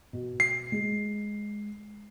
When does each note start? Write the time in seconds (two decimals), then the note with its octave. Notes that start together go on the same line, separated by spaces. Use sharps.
0.13 B2
0.40 C7
0.72 G#3